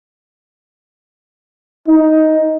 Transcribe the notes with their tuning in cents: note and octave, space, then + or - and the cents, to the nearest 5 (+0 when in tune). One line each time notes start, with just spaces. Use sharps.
D#4 +10